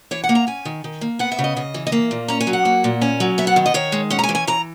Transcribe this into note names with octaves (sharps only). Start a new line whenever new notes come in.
E3 C#5
F#5
A#3
A#5
C#4 G#5
D#3
D#3
A#3
B3 F#5
E5
C#3
D#5
C#3 D#5
E3
D#5
A#3 E5
A#2
C#4 A#5
G#5
F#3
F#5
A#3
A#2
C#4
F#3
B3 E5
F#5
D#3
D#5
D#3 C#5
G#3
C#4 F#5
A#5
G#5
E3
G#5
E3 A#5